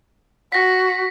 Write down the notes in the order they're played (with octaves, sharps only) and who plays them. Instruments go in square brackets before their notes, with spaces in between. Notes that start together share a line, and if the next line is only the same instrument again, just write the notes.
[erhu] F#4 [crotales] A#6 B6